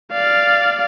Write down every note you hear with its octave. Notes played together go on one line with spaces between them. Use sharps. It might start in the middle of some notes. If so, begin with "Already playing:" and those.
D5 F5